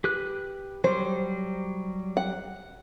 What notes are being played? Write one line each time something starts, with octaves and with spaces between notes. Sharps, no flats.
G4 B4 F#6
F#3 G3 C5
F#5